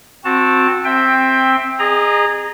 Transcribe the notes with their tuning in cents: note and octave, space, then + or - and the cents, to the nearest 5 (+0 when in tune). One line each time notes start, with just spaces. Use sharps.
C4 +0 F#4 -20 A5 +0
C4 +5 E5 -5 G5 +15
G#4 -10 D#5 -35 A#5 +5